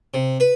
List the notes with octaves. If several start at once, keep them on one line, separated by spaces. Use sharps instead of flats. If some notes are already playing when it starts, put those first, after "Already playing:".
C3
B4